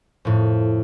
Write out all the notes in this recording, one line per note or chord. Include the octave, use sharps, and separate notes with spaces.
F2 A2